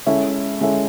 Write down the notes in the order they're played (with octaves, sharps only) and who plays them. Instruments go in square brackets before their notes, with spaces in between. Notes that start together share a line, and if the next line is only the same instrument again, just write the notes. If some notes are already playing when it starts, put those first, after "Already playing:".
[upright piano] G#3 C#4 E4 A4
G#3 C#4 E4 A4